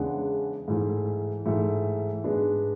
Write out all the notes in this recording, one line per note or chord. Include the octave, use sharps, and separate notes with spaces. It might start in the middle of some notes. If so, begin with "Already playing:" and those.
Already playing: E2 C#3 G#3 D4 F#5
G#2 E3 A3
G#2 E3 A3
G#2 G#3 B3 D4